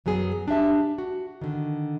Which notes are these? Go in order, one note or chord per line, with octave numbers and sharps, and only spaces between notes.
F#2 F#3 B3 G#4
D4 G4 E5 A5
F#4
D3 D#3